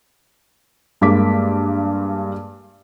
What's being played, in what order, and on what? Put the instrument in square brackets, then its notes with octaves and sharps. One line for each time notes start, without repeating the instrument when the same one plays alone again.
[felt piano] G2 G#3 A#3 D6 B6